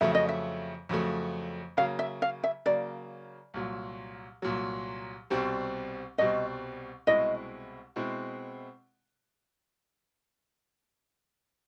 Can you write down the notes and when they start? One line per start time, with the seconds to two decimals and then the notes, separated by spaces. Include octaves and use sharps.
0.01 F2 C#3 F#3 A3 E5
0.15 D#5
0.29 E5
0.89 F2 C#3 F#3 A3
1.77 C#3 F#3 A#3 F5
1.99 E5
2.22 F5
2.44 E5
2.66 C#3 F#3 A#3 D5
3.54 C2 A#2 F#3
4.42 C2 A#2 F#3
5.30 C2 B2 G3 C4
6.18 C2 B2 G3 C4 D#5
7.07 C2 B2 G#3 C4 E4 D#5
7.96 B2 G#3 C4 E4